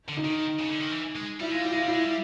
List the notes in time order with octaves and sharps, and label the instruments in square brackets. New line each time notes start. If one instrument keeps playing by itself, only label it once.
[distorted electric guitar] D3
[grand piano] D#4
[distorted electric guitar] D#3
C#3
D3
D#3
E3
G#3
[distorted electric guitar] G3 [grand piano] E4
[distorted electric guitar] G#3 [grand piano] F4
[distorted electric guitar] G3 [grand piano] E4
[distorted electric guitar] G#3 [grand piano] F4
[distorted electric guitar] G3 [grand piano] E4
[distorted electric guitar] G#3
G3